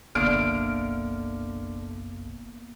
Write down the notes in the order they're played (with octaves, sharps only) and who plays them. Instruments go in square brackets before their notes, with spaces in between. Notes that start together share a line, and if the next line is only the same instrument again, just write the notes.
[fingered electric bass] F#1 B1 B2 [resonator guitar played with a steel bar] D3 [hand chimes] A#3 B3 [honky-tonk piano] F6 D7